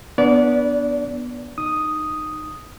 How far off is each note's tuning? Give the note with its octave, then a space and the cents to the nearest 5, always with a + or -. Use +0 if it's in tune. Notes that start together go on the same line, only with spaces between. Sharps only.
B3 -15 D4 +0 D5 -30
D#4 -20 D#6 +0